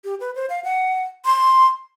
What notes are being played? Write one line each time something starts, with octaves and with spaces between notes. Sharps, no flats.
G4
B4
C5
F5
F#5
C6